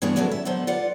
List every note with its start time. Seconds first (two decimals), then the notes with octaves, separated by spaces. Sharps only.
0.02 G2 E3 B3 D4 G#4 C#5
0.16 D2 F#3 C#4 E4 A4 A#4
0.31 E5
0.45 D3 F#3 B3 C5
0.67 F4 B4 D5 F#5